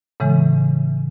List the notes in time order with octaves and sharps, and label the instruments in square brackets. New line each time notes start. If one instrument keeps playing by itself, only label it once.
[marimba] A2 C#3 E3 G#3